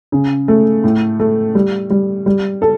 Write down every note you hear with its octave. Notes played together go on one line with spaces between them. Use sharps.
C#3
A3
A2
A3
G3
G3
G3
A4